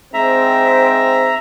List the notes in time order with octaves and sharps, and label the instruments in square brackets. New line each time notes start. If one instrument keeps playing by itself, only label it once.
[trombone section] G#2 C4 [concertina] E5 A#5